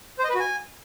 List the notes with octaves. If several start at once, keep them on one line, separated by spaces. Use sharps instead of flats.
C5
D#5
B4
F#4
G#5